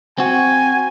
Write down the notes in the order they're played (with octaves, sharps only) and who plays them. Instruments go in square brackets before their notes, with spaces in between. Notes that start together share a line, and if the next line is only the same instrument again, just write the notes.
[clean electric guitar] C4 F#4 [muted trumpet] G#5